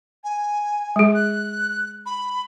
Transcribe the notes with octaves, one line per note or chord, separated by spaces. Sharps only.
G#5
G#3 G#4
F#6
B5